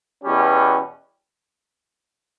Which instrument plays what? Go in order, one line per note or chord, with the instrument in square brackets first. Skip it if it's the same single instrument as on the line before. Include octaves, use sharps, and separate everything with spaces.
[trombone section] E2 B2 G3 C#4 G4